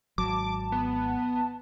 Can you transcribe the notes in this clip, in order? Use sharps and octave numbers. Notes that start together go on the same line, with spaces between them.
G#1 F#3 A5 D6
B3